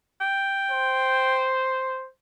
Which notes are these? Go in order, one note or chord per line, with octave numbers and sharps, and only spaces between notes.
G5
C5